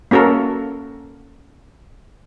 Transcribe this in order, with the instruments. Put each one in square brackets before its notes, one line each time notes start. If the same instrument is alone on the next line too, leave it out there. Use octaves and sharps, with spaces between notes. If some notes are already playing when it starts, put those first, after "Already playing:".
[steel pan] A#3 C#4 F#4 A4 A#4